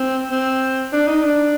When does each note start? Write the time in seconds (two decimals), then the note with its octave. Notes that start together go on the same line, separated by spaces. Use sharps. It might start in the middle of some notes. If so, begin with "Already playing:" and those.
Already playing: C4
0.31 C4
0.93 D4
1.08 D#4
1.24 D4